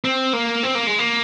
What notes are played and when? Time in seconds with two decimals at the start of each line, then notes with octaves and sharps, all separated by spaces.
0.04 C4
0.33 A#3
0.63 C4
0.75 A#3
0.87 G#3
0.99 A#3